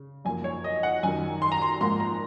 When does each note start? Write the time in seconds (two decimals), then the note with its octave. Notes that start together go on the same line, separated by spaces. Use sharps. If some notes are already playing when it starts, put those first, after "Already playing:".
Already playing: C#3
0.25 F#2 F3 A#3 G#5
0.44 C#5
0.64 D#5
0.83 F#5
1.03 F#2 D#3 F#3 G#5
1.42 C6
1.52 A#5
1.62 C6
1.81 G#2 F3 A#3 C6
2.00 A#5